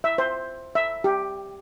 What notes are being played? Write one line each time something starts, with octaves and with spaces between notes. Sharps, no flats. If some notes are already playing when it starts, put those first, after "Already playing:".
E5
C5
E5
G4